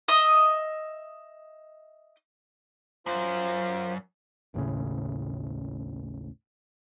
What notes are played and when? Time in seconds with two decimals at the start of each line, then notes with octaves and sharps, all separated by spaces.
0.08 D#5 E5 D#6
3.06 F#2 F4 C5
4.54 A1 D#2 A2 C#3